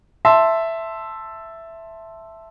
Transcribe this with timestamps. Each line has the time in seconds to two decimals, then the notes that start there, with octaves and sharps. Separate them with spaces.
0.25 E5 A5 C6